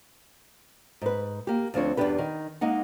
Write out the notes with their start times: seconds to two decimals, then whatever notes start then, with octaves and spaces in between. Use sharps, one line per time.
1.02 G#2 B4
1.47 A#3 G4
1.74 D2 F3 C4 D4 C#5
1.97 E2 G2 B3 D4 G4 B4
2.18 D#3
2.61 G#3 A#3 D#4 F#5